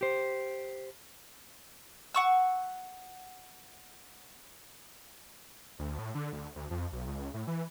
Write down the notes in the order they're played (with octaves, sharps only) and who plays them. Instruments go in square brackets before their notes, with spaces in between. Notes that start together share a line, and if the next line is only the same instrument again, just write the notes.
[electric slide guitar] G4 C5
[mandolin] F#5 C#6 E6
[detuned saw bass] D2
A2
D3
D2
D2
F2
B1
C#2
A2
E3